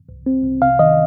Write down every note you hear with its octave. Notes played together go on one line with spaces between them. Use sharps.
C2
C4
C2
C3 F5
D#3 D#5